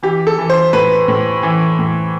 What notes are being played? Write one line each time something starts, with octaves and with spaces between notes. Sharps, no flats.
E3 G4
A4
E3
C5
A2 B4
A2
E3
A2